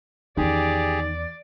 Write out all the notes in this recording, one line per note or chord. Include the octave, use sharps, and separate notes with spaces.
E2 D#3 C#4 G4 G#4 D5